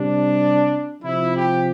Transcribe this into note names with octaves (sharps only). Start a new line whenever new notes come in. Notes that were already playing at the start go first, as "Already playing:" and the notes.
Already playing: C3 G3 D4
C3 F3 E4
G4